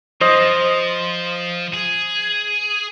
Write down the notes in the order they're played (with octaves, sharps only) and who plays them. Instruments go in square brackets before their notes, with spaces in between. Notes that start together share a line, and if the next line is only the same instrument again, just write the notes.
[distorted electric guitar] F3 [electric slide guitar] C5 D#5
[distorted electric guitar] G#4